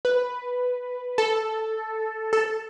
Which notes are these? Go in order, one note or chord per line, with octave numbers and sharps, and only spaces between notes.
B4
A4
A4